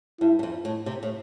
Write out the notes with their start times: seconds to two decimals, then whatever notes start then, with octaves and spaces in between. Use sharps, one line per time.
0.21 G2 E4
0.39 G2
0.43 F2
0.65 A2
0.86 C3
1.03 A2